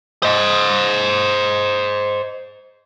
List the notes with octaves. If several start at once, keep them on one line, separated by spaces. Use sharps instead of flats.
C5 D#5